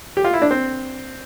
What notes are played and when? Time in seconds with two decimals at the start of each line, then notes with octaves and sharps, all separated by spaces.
0.17 G4
0.24 F4
0.33 E4
0.42 D4
0.51 C4